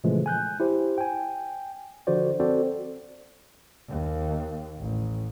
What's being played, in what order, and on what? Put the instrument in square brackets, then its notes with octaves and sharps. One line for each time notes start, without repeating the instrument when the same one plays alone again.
[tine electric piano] A#2 C#3 E3 F3 G#3 A3
G#5 F#6 G6
E4 G4 C5
G5 G#5
D3 F3 F#4 C5 D5
C4 F#4 A4 C5 D5
[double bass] D#2
A1